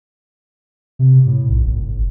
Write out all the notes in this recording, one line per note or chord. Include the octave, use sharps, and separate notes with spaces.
C3
A2
B1
G1